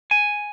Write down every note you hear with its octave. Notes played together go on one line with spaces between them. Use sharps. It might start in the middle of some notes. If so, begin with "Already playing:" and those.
G#5